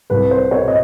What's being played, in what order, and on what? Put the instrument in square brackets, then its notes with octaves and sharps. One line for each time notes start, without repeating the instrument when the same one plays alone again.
[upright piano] C2 B4
C5
B2 C#5
D#5